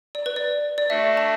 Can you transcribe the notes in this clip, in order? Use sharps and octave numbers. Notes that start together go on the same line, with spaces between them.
D5
B4
D5
D5
A3 D4 F#4 A4 E5
A5